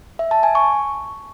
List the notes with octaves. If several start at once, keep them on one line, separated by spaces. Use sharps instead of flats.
E5
A5
G#5
C#6